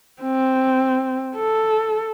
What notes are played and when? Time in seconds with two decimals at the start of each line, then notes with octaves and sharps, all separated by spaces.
0.22 C4
1.36 A4